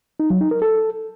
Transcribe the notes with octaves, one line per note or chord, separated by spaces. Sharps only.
D#4
F#3
D#4
A#4
A4